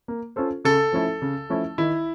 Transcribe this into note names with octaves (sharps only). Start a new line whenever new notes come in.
A#3
C#4 F4 A4 C5
C#3 A4
F3 A3 C#4 E4
C#3
F3 A3 C#4 E4
D#3 E4